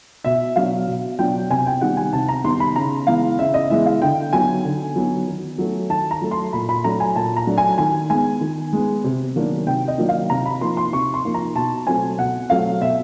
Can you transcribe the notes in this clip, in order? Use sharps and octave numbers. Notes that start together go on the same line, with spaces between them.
B2 E5
F#3 B3 D4 F5
B2
F#3 B3 D4 G5
C3 G#5
G5
D#3 G3 B3 D#4 F#5
G#5
C3 A5
A#5
D#3 G3 B3 D#4 C6
B5
C#3 A#5
E3 G#3 B3 F5
C#3 E5
D#5
E3 G#3 B3 E5
F5
D3 G5
F#3 B3 D#4 G#5
D3
F#3 B3 D#4
D#3
F#3 A3
D#3 A5
A#5
F#3 A3
C6
A#2 B5
B5
F#3 A3 D4 A#5
G#5
A#2 A5
A#5
F#3 A3 D4
G#5
D#3 G#5
G#3 B3 G#5
D#3
G#3 B3
C3
D#3 F#3 A#3 D4
C3 G5
D#5
D#3 F#3 A#3 D4
F5
C3 A#5
B5
F3 A#3 D#4 C6
C6
C3 C#6
C6
F3 A#3 D#4
A#5
B2 A5
F#3 A3 C4 G#5
B2 F#5
F#3 A3 C4 F5
B2 E5